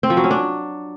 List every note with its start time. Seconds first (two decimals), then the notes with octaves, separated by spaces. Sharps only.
0.03 C4
0.10 F3
0.17 F#3
0.24 C#4
0.31 D4